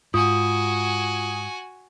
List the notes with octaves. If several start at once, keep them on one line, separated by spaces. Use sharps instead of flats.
G#2 F4 F#4 G#5 D#6